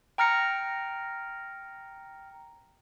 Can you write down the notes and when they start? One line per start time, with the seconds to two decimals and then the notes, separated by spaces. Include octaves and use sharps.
0.18 G5 A#5 F6 A#6 C#7